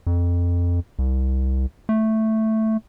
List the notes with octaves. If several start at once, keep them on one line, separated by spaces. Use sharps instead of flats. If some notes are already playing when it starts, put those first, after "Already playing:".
F2
C2
A3